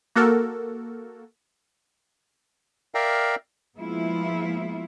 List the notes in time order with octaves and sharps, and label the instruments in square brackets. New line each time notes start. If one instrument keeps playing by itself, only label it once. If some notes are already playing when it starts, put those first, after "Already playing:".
[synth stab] A#3 F#4 A4 A#4
[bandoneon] A#4 D5 E5 F5 G5 A#5
[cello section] F3 G#3 A#3 B3 E4 F4